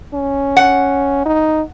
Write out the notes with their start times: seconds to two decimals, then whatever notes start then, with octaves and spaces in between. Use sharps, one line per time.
0.14 C#4
0.57 F#5
1.25 D#4